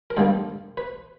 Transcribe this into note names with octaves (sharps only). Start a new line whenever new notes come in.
A#4
G2 D3 G3 A#3 A4
B4